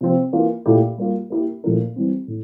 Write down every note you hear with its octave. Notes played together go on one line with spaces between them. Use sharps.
C3 F3 C4
E3 A#3 F4
A#2 A3 E4 G4
G3 A#3 F4
A#3 E4 G4 A#4
A#2 F3 A3 E4 A#4
E3 G3 C4
A2